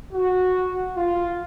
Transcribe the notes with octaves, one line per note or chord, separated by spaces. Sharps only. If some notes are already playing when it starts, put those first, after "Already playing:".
F#4
F4